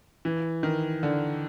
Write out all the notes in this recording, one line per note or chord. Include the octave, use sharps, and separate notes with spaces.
E3
D#3
D3